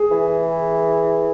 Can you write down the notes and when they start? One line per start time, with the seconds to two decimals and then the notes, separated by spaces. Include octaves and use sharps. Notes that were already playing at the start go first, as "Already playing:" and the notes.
Already playing: G#4
0.11 E3